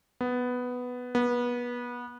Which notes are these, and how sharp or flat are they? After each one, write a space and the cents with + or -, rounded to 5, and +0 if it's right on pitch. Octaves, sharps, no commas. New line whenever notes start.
B3 +5
B3 -25